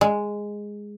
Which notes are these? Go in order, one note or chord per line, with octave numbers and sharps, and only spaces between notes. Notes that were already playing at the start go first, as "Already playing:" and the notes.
G#3